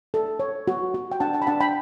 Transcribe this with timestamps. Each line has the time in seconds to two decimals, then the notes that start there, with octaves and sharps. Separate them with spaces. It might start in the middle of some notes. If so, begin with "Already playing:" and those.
0.14 A4
0.39 C#5
0.68 F#4
0.94 F#4
1.12 G5
1.20 D4 F#5 A5
1.33 F#5 A5
1.42 B5
1.47 D4 F#5 A5
1.60 G5 B5